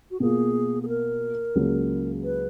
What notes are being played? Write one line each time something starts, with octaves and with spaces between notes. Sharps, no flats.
F#4
B2 A#3 F4 G#4
G#4
A#4
C#2 C#3 F#3 A#3
B4